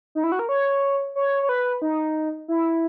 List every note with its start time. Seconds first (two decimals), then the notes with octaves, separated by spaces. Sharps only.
0.15 D#4
0.24 E4
0.32 F#4
0.39 A#4
0.49 C#5
1.16 C#5
1.43 C#5
1.49 B4
1.82 D#4
2.48 E4